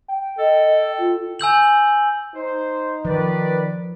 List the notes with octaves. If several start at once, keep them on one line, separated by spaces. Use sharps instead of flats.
G5
A4 D#5
F4
G#5 E6 G6 F#7
D#4 C5
D#3 F3 B4 D5